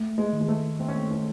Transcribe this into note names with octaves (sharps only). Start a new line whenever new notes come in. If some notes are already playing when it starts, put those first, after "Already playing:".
Already playing: A3
G#3
D#3
G#3
A3
A3 C4
C#4
C4
C#4